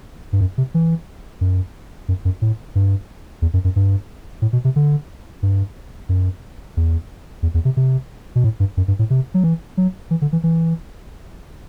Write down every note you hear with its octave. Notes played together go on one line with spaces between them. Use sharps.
G2
F#2
C3
E3
F#2
F#2
F#2
A2
G2
E2
F#2
F#2
G2
A2
B2
C3
D3
G2
F#2
E2
E2
E2
C3
C3
B2
A2
G2
F#2
G2
A2
C3
F#3
E3
F#3
E3
D3
E3
E3